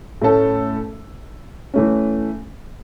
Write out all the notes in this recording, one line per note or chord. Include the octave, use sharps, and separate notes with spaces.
A2 A3 C#4 A4
E3 A3 C#4